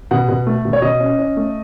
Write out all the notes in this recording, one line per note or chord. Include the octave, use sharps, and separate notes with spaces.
B2 F#5
B2
A3
B2
C#5
B2 D#5
C#4
C#4
A3